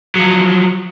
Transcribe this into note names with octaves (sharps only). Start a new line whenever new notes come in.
F3 F#3